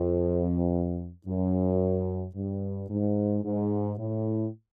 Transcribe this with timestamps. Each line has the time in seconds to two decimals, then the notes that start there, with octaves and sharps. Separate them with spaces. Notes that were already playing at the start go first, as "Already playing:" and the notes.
Already playing: F2
1.27 F#2
2.36 G2
2.89 G#2
3.44 G#2
3.98 A2